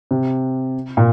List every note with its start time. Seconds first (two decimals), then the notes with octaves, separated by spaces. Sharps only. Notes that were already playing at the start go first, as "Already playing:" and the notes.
0.11 C3
0.97 A#2